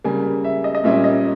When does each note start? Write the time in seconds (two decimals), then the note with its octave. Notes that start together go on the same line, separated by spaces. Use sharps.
0.04 C#3 G3 A#3 G#5
0.44 E5
0.64 D#5
0.75 D#5
0.84 A#2 G3 A#3 C#4 E5
1.04 D#5